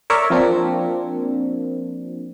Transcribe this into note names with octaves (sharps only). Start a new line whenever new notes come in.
A#4 C#5 D5 E5
F3 A#3 C4 D4